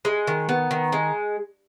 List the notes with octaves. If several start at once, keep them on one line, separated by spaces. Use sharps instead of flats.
G#3
D#3
B3
D#3
G#3